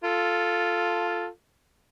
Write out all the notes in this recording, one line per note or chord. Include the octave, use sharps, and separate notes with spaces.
F4 A4